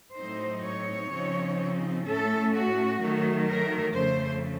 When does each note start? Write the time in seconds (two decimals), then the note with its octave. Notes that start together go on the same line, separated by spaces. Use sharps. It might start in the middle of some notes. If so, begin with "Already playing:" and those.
0.16 A2 F#3 C4 D#4 C5
0.63 C#5
1.11 C#3 F3 C4 D#4
2.05 A2 A3 C#4 A4
2.53 F#4
3.00 D#3 F#3 A3
3.48 A#4
3.95 F2 C#3 A3 C5